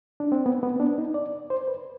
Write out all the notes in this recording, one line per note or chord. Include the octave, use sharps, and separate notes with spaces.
D4
C4
B3
B3
C4
D4
D#4
D5
C5
B4